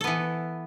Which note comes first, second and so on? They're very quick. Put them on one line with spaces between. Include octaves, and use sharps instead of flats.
A4 B3 E3